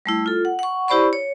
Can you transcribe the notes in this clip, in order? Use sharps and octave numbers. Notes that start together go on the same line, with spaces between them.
G3 A3 E4
F4 A4
F#5
F#5 C#6
E4 G4 C5 D5 B5 C#6
C#5